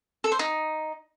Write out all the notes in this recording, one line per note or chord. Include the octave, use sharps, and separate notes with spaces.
A4
C5
D#4